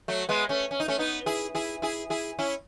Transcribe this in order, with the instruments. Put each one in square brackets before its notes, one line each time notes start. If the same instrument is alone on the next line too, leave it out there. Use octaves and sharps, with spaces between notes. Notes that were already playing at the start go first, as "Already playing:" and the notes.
[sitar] F#3 A3
G#3 B3
A3 C#4
C#4
D#4
A3 C#4
B3 D#4
E4 G#4
E4 G#4
E4 G#4
E4 G#4
C#4 E4